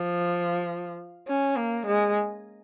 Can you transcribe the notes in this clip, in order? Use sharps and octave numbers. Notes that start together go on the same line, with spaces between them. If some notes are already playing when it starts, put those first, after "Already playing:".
Already playing: F3
C#4
A#3
G#3